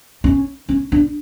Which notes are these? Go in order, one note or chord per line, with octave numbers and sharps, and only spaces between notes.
C#4
C#4
D4